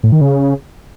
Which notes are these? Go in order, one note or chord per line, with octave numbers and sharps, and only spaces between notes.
A2
D#3
C#3